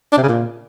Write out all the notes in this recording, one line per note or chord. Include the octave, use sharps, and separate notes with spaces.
D4
C3
C#3
A#2